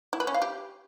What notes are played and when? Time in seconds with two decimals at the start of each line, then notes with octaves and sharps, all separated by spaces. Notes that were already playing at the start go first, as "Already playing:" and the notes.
0.13 E4
0.20 B4
0.27 C#4
0.34 F5
0.42 G4